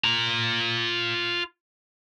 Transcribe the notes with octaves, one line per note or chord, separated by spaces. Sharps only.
F4 A#5